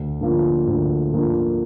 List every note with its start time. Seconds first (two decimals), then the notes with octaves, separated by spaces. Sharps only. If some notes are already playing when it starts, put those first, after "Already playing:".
Already playing: D2
0.21 D3 F3 A#3
0.67 D2
1.13 D3 F3 A#3